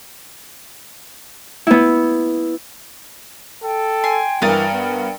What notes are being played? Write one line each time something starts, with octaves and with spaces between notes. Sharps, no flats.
B3 E4
A4 G5
G#5 C6
G2 E3 A#4 F5 D#6 A6
B3